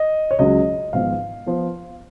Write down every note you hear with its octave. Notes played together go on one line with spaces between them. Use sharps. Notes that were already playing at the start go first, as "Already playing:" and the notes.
Already playing: D#5
C#5
C#2 C#3 F#3 D#5
G#1 G#2 F3 B3 F5
F3 B3